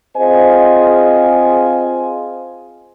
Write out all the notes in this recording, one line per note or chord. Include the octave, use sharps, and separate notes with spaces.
C4 F4 G#4 C5 D#5 G#5